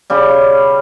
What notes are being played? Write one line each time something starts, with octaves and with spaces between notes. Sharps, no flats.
C#3 G3